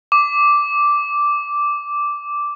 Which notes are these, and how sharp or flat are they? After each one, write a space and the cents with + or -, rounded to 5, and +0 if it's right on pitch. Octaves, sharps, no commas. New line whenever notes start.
D6 -5